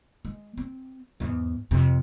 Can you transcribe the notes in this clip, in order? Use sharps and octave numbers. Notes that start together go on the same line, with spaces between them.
G#3
C4
E2 G#2
F2 C3